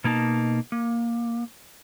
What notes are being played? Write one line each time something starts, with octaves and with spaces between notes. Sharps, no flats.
B2 A#3 D#4 A5
A#3